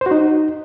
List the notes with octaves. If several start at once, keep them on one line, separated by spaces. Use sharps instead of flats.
C5
F#4
D#4